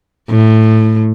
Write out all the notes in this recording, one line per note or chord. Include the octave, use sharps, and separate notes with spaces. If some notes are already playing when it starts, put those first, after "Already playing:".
A2